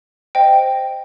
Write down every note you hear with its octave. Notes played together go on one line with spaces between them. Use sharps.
C5 D#5 G5